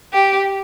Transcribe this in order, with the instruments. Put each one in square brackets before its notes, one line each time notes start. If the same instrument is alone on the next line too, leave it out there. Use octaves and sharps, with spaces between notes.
[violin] G4